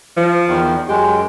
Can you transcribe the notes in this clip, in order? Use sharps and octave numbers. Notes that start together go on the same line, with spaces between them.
F3
E2 D#3
F#2 G#3 G4